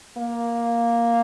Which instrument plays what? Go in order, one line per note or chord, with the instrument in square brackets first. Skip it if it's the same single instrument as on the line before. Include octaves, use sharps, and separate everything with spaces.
[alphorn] A#3